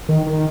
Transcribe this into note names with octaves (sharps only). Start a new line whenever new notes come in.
D#3
D#3